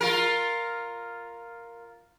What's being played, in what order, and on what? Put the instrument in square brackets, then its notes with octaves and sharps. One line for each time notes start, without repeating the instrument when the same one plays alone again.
[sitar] F4 A#4